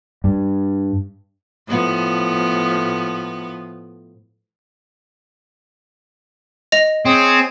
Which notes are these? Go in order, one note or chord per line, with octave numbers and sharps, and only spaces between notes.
G2
A2 F3 B3
D#5 A#6 F7
C4 G#4 C#5 G#5